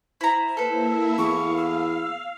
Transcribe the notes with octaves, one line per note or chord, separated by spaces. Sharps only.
E4 C5 A#5
A#3 E4 A4 B4 E5
E2 F5 C#6
E6